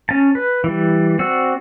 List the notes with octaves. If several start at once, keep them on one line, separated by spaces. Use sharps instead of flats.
C#4 A5
B4
E3 G3
C4 F#4 D5 E6